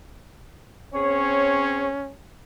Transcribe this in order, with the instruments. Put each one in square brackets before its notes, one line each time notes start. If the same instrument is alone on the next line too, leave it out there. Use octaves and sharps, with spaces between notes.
[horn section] C4 G#4 C#5 [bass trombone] C#4